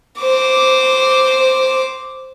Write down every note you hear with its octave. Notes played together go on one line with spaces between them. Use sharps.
C5 D6